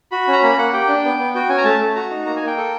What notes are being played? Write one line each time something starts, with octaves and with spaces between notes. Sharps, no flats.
F#4 B5
C#4 A#5
A#3 B5
A#3 F#5
G4 G5
D4
B3
B3
F#4 G5
C#4 G#5
A#5
A3 A5
A3
F#4 A#5
D#4
A#3 A#5
G#5
A#3
G5
A4